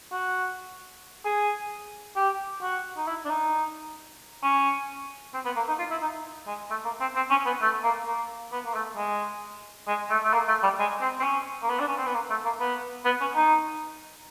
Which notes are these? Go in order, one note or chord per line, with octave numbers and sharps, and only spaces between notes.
F#4
G#4
G4
F#4
D#4
E4
D4
D#4
C#4
C4
B3
A#3
D#4
F4
E4
D#4
G#3
A3
A#3
C4
C4
C#4
B3
A3
A#3
A#3
B3
A#3
A3
G#3
G#3
A3
A3
A#3
A3
G3
G#3
C4
C4
C#4
A#3
B3
D4
C#4
C4
B3
A#3
A3
A#3
B3
B3
C#4
D#4